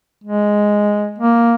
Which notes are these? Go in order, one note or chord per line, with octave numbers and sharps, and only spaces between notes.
G#3
A#3